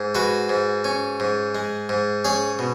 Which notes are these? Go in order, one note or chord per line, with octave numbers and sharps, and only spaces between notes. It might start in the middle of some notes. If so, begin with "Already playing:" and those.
Already playing: G#2
G#3 F#4 B4
G#2
C#4
G#2
G#3
G#2
C#4 G#4 C#5
B2